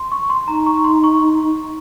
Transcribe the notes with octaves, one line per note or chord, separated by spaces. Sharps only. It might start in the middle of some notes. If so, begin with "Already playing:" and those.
Already playing: C6
C#6
C6
D#4 A#5
C#6
C6
C#6